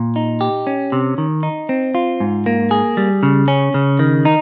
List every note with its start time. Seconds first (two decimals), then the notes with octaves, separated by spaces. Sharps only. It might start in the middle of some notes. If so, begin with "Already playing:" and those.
Already playing: A#2
0.16 D#4
0.41 G4
0.67 C#4
0.92 C3
1.18 D#3
1.43 D#4
1.69 C4
1.95 F4
2.20 G#2
2.46 A#3
2.71 G#4
2.97 G3
3.23 C#3
3.48 C#4
3.74 C#3
3.99 D#3
4.25 D#4